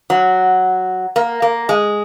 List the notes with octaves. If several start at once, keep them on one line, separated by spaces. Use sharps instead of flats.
F#3
A#3
A#3
G#3